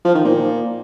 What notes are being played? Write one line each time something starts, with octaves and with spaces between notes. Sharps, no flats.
F3
D#3
A#2